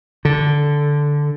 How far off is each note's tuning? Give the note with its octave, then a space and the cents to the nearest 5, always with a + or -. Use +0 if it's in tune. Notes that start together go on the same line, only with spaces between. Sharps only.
D3 -5